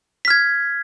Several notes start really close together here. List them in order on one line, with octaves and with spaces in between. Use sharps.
B6 F6 G#6